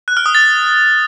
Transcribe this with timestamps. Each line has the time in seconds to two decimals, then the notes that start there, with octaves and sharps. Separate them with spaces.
0.08 F#6
0.17 F6
0.26 D#6
0.35 A6